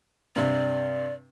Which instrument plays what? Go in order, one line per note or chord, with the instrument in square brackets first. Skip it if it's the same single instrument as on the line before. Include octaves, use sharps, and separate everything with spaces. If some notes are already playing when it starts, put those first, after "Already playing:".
[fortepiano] G2 C3 [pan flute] D5